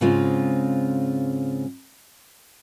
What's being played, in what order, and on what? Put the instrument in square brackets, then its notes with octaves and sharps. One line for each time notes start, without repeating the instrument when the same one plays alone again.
[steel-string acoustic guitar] G#2 C#3 G#3 C4 F4